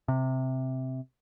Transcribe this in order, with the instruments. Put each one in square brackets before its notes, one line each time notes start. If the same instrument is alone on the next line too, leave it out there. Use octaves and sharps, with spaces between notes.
[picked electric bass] C3